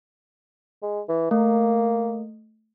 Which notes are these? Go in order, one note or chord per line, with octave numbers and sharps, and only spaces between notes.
G#3
E3
A3 A#3